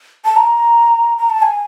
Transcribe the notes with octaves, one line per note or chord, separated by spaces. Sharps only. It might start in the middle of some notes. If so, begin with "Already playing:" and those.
A5
A#5
A#5
A5
G#5